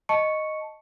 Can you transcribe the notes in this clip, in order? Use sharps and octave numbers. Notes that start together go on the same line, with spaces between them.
D#5 A5 C#6 C#7